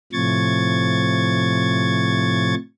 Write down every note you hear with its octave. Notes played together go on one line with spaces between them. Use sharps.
A2 C3 F3 C#6 G#6 A6